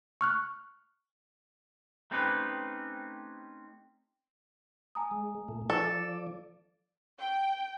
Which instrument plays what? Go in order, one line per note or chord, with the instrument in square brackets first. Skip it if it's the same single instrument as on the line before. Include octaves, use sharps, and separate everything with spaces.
[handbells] C#6 F6 F#6
[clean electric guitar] A3 C4 C#4 D#4 G4 B4
[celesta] G#5 A#5 D#6
[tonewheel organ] G#3
A#2 A3
[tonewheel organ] F3 D5 [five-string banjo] A4
[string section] G5